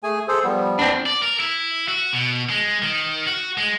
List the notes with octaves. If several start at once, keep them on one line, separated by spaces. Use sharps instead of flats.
A3 G#4 G#5
G#4 A4 C5
F3 G3 B3
F2 C4 D4
D5
A#4
E4
F#4
B2
G#3
D#3
F#4
G#3